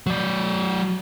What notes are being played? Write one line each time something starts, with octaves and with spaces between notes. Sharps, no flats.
F#3 D5